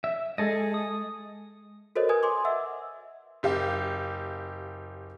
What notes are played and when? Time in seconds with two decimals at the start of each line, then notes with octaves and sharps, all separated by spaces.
0.04 E5
0.38 G#3 G#4 A4 D#5
0.74 D#6
1.96 F#4 A4 A#4 C5 C#5 D#5
2.09 A#4 B4 G#5 D#6 G#6
2.23 G#5 C6 D6
2.45 D#5 E5 F#5 E6
3.43 F#1 G4 F5